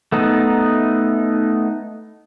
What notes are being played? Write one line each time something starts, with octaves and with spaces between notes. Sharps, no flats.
A3 B3 D#4